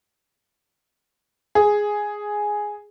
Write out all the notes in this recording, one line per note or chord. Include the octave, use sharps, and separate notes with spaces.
G#4